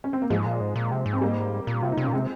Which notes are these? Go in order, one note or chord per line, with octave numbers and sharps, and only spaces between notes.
C#4
C4
A#3
G#2 F3 G#3
A#2
G#2
A#2
C3
G#2
C4
G3 A#3
A#2
C3 F4
D#4
C3
C#4
A#2
C3 G#3 C4